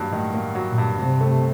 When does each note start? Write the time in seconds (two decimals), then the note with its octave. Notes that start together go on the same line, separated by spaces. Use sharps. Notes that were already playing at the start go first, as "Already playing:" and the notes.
Already playing: G2 D#3 F#3 A#3
0.12 A2 D#3
0.34 A#3
0.55 F#3
0.70 A#2
0.78 G2
0.99 G2 C3
1.21 A3